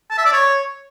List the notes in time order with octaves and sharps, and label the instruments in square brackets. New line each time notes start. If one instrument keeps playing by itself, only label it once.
[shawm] A5
E5
D5
C#5